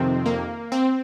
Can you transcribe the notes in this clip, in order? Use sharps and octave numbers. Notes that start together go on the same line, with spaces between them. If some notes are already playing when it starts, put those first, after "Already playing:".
Already playing: F2 C3 D#3 C4
A#3
C4